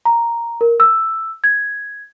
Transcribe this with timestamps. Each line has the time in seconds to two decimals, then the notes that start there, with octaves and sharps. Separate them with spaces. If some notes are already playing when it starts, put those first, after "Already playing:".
0.05 A#5
0.61 A#4
0.80 E6
1.44 G#6